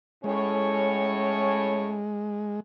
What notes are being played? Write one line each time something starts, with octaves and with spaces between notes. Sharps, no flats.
A2 G#3 C#4 C#5